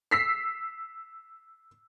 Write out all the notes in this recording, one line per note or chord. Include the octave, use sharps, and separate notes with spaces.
E6 B6 C7